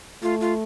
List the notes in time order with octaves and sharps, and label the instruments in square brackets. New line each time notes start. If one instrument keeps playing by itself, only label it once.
[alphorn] A3 [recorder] F4
[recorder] F4